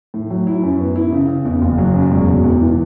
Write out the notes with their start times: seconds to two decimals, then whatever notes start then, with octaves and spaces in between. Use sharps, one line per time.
0.14 A2
0.30 F#3
0.47 E4
0.63 F#2
0.80 B3
0.96 E4
1.12 C#3
1.28 C#3
1.45 E2
1.62 F#1
1.78 F#3
1.94 F#2
2.11 E1
2.28 E1
2.44 E2
2.61 E3